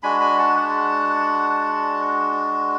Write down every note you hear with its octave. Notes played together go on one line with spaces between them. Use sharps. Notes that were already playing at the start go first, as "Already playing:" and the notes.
G#3 D4 F#4 G#5 B5
G#5 B5
F#5 A5
F#5 A5